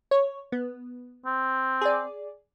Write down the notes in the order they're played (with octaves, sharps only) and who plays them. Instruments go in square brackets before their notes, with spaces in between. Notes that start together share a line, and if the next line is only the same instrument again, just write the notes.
[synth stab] C#5
B3
[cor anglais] C4
[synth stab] G#4 D5